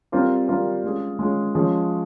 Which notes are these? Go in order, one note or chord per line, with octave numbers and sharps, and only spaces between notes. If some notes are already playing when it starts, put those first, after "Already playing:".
G3 C4 F4 A#4
G3 C4 F4 A#4
G#3 C#4 F4 G#4
G#3 C#4 F4 G#4
F3 G#3 C#4 G#4